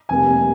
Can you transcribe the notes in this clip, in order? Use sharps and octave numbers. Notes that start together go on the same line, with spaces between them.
F1 F2 C3 G3 A#3 G#5